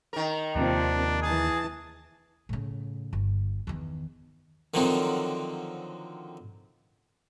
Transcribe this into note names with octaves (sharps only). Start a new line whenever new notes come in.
D#3 A#4
D#2 C3 F3 A#3 C4 D4
E3 G#4 A5
A2 C#3
G1
E2 D#3
D3 D#3 F3 F#3 C4